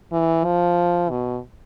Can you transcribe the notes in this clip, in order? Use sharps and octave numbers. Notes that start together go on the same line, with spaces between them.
E3
F3
B2